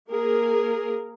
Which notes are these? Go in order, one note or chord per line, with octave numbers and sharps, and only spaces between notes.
A#3 G#4 A#4